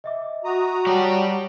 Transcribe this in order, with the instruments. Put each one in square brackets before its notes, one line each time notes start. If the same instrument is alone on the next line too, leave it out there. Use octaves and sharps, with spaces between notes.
[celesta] D#5 E5 D6
[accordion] F#4 A#5 D#6
[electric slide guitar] G3 G4 [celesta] C#5 F#5 A5